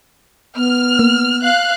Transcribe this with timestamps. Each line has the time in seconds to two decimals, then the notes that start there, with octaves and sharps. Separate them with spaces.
0.56 B3 F6
0.99 A#3
1.43 F5 F#6